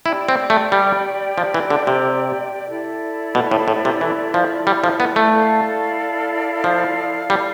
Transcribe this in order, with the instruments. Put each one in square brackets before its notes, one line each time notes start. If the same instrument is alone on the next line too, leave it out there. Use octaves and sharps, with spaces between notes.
[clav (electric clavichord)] E4 [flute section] G4 D5 G5
[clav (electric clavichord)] C4
A3
G3
F3
E3
D3
C3
[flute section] E4 A4 D5
[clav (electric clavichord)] B2
A2
A2
C3
E3
F3
G3
F3
B3
A3
[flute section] E4 A4 D5 F5
[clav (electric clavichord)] F3
G3